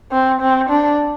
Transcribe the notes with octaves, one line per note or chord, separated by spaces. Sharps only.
C4
C4
D4